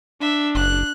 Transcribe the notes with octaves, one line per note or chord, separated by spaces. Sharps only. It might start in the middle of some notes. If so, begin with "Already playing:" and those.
D4 E5
F#1 F#6